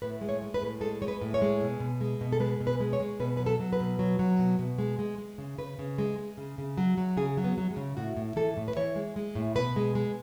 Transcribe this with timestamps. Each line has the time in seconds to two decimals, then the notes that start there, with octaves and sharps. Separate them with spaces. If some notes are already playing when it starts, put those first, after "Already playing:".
0.02 A2 B4
0.21 G#3
0.29 C#5
0.42 G#3
0.54 B4
0.62 A2
0.81 G#3 A4
1.02 G#3 C#5
1.08 B4
1.22 A2
1.34 C#5
1.42 G#3
1.61 B2
1.80 B2
2.01 G#3
2.21 B2
2.32 A4
2.40 G#3 B4
2.60 B2
2.67 B4
2.80 G#3
2.93 C#5
3.00 G#3
3.20 B2 B4
3.37 F#3 B4
3.46 A4
3.60 F#3
3.73 B4
3.80 B2
3.99 F#3
4.19 F#3
4.39 B2
4.59 B2
4.78 G#3
4.99 G#3
5.18 G#3
5.38 C#3
5.58 C#3 B4
5.79 C#3
5.98 G#3
6.18 G#3
6.37 C#3
6.58 C#3
6.78 F#3
6.98 F#3
7.17 C#3 G#4
7.37 F#3
7.44 B3
7.58 F#3
7.71 G#3
7.77 C#3
7.97 A2 F#4
8.17 A2
8.36 E3 A4
8.57 A2
8.68 B4
8.76 E3 C#5
8.96 G#3
9.16 G#3
9.35 A2
9.55 B2 B4
9.76 G#3
9.95 G#3